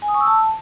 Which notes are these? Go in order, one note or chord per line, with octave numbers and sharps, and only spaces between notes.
G#5
D#6
C#6
E6
A5